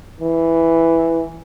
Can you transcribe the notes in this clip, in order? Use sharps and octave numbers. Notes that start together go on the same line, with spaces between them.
E3